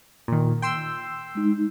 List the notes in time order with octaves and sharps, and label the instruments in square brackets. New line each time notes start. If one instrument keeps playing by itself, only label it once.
[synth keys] A#2 D#3
G5 C6 E6
[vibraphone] G#3 D#4